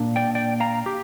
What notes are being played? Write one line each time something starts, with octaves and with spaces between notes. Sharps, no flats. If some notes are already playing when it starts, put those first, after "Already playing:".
Already playing: A#2 A#3 D4
D5 G5
D5 G5
F5 A#5
G4